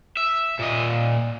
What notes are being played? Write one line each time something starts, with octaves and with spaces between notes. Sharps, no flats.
E5
A#2 D#5